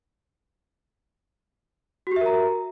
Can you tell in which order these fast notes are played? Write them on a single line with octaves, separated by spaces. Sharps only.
F#4 G4 E5 A#4 A#5